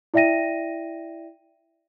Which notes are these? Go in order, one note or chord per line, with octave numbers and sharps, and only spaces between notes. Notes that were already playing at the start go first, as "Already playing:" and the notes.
E4 D5 E5 G5 A#6 D#7